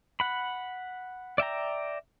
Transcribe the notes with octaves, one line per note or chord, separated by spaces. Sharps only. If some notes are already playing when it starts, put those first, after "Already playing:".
F#5 B5
D5 E5 G5 A#5